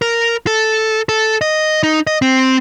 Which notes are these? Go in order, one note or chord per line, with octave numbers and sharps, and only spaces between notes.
A#4
A4
A4
D#5
D#4
D#5
C4